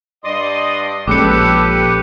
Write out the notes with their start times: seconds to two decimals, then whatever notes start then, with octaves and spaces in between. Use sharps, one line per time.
0.24 G2 D5 D#5 C6 D#6
1.08 A#1 G#3 C#4 G4 A4 B4 D6 C#7